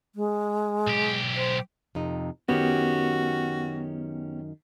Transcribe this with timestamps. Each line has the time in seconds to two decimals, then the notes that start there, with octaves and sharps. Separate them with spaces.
0.15 G#3
0.87 B1 G4
1.36 C5
1.95 F2 C3 D#4
2.49 F#2 D#3 B3 C#4 F#4 G4